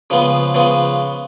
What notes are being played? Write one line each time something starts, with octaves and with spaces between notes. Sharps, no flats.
C#3 F3 G#3 B3
C#3 F3 G#3 B3